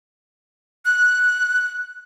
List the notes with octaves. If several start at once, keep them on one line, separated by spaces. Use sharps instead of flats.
F#6